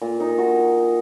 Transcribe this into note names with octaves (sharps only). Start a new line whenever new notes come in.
A#2
D#4
A#2
F#4